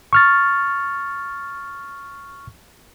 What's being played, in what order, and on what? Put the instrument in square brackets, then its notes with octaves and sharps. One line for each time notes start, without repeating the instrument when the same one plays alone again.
[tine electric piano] C#6 F6 A6